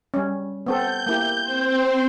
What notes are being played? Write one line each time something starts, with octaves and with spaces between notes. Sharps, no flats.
G3 C#4
B3 C4 A4 G6
A#3 E4 G4
C4 C5